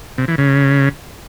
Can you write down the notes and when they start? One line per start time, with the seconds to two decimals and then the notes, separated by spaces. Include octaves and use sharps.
0.18 C3
0.28 E3
0.38 C#3